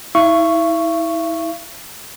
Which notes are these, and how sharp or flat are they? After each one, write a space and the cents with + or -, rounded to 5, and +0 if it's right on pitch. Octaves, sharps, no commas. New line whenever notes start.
E4 -35 E5 +45 C#6 +0